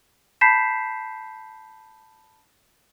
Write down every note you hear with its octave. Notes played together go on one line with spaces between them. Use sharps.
A5 B5 G6 B6 C7 E7